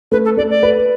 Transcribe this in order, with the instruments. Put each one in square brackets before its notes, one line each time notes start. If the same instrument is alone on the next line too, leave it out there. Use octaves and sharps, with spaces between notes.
[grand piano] A3 [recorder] B4
[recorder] A4
[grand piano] A3 [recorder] D5
[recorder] D5
[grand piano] B4